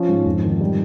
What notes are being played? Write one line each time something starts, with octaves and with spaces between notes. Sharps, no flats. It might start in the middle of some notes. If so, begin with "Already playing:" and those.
Already playing: F3 C#4
G#2
F2
D#3
G3